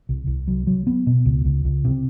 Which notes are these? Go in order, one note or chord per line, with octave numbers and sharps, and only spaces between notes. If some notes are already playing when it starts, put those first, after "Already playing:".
C2
C2
F#3
F#3
B3
B2
C#2
C#2
C#2
C3